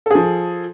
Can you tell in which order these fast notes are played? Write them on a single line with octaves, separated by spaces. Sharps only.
A4 G#4 F3